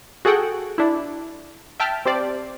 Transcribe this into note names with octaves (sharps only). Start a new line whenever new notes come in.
F#4 G#4 A4 F#5 G5
D4 E4
E5 G5 A5 F6 B6 D7
C4 G4 C5 D5